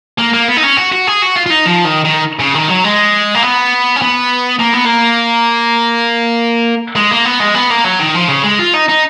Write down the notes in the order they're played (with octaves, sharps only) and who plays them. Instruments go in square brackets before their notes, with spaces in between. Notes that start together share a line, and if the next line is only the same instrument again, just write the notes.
[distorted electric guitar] A#3
A#3
B3
D#4
C#4
F#4
F#4
G#4
F#4
F4
F4
D#4
F3
D#3
D#3
C#3
D#3
F#3
G#3
A#3
B3
C#4
B3
A#3
B3
A#3
G#3
A#3
B3
G#3
B3
A#3
F#3
D#3
F3
C#3
G#3
F4
D#4
D#4